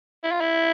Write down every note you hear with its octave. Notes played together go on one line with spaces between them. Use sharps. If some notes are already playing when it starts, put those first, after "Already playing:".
E4
F4
E4